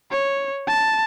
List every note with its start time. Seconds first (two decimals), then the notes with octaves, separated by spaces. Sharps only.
0.11 C#5
0.67 A5